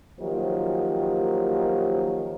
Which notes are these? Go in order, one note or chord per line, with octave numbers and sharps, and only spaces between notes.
D#3 F3 F#3 A#3 G4 C5